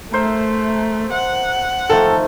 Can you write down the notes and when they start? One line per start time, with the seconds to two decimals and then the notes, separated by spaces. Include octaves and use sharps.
0.13 A3 A#4 C5 E5
1.13 F#5
1.90 D#3 F3 A3 A4